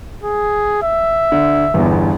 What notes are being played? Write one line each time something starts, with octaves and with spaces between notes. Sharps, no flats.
G#4
E5
D3
G1 E2